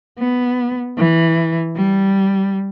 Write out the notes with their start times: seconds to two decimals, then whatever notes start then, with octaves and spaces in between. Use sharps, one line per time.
0.19 B3
0.98 E3
1.76 G3